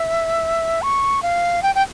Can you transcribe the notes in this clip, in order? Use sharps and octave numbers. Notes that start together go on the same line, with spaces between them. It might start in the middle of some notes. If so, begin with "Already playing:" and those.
Already playing: E5
C#6
F5
G5
G5